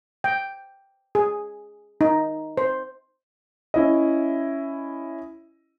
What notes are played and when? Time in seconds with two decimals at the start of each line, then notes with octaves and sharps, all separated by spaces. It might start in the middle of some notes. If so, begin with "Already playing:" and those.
0.24 G5
1.15 G#4
2.01 D#4
2.57 C5
3.74 C#4 E4 D#5